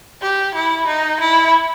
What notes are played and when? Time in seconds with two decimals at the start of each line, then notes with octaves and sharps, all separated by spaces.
0.22 G4
0.55 E4
0.87 D#4
1.20 E4